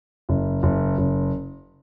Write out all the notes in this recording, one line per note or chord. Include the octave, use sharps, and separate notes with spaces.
F#1
F#1
F#1